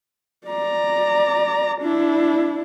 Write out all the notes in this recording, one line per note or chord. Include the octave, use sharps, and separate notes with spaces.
D5 A#5
D4 E4